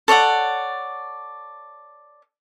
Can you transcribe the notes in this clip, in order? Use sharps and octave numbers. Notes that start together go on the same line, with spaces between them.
A4 C#5 D5 F#5